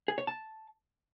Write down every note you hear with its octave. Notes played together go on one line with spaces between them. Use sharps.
G#4
C#5
A5